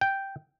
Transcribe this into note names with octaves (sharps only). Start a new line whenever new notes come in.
G5